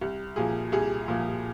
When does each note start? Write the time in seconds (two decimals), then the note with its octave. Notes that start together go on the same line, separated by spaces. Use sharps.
0.01 C2
0.36 A#2 F3 G#4
0.72 C2 G#4
1.08 A#2 F3